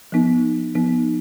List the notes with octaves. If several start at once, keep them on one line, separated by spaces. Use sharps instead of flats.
F3 B3 D#4
F3 B3 D#4